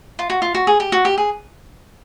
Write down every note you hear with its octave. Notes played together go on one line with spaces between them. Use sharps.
F4
F#4
F4
F#4
G#4
G4
F#4
G4
G#4